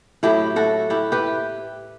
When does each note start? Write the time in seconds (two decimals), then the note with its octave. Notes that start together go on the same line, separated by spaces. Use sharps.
0.23 A2 F#3 A3 E4 G4
0.56 F#4 A4
0.90 E4 G4
1.12 G4 B4